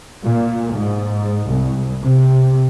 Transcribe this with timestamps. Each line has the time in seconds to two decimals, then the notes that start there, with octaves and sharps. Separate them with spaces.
0.25 A#2
0.73 G#2
1.48 C2
2.03 C3